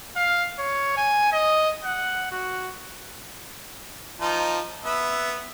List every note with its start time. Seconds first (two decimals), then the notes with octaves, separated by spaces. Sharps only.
0.16 F5
0.59 C#5
0.97 G#5
1.32 D#5
1.84 F#5
2.31 F#4
4.20 F3 D#4
4.85 B3 E5